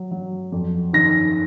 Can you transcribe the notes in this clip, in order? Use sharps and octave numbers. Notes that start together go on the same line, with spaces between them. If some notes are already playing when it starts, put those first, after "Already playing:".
Already playing: F#3
F#3
F2
D#3 A#6